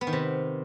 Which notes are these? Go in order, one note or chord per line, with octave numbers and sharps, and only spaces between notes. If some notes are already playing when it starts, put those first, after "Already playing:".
B3
D#3
C3